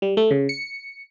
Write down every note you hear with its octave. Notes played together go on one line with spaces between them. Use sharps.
G3
A3
C#3
C#7